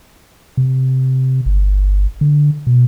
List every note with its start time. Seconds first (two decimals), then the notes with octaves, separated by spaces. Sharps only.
0.57 C3
1.46 G1
2.21 D3
2.67 B2